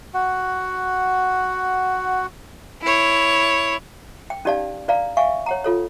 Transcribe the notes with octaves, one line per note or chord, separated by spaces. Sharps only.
F#4 F#5
E4 C#5
G5
C#4 D#4 G4 D5 F5 A5
D4 B4 D5 F5 A#5
E5 F5 G#5 C#6
C#5 F#5 A#5
F4 A4 C#5